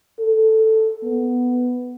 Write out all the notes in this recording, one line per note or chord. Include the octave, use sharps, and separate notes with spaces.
A4
B3